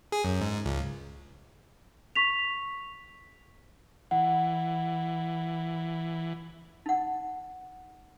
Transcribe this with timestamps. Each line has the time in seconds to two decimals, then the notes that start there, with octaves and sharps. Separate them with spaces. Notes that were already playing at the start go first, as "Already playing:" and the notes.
0.12 G#4
0.25 F#2
0.41 G#2
0.65 C#2
2.16 C#6 B6 F7
4.11 E3 F#5
6.86 D#4 F#5